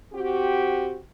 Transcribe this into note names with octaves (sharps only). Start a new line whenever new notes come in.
C4 F#4 G4